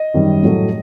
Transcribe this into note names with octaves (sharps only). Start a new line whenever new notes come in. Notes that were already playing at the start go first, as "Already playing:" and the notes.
Already playing: D#5
F#2 D#3 G3
A2 F#3 A3